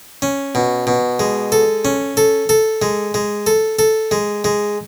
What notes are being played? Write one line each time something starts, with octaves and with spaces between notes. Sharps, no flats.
C#4
B2
B2
G#3
A4
C#4
A4
A4
G#3
G#3
A4
A4
G#3
G#3